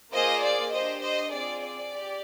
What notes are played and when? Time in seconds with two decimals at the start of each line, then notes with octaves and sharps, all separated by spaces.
0.13 A#3 F4 G#4 C5 D#5
0.43 D5
0.72 D4 G4 C5 D#5
1.02 C5 D#5
1.32 C4 F4 G#4 D5
1.62 D5
1.92 G4